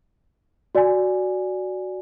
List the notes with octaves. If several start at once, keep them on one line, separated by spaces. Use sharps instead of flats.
F#4 D5 G#5